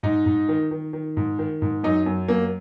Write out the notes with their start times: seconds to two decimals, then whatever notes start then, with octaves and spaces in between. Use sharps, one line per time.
0.03 G#2 D#4
0.26 G#2
0.49 D#3
0.71 D#3
0.93 D#3
1.17 G#2
1.39 D#3
1.62 G#2
1.83 F#2 D#4
2.06 F#2
2.28 F#2 A#3